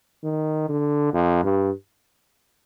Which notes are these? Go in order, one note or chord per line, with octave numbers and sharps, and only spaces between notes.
D#3
D3
F2
G2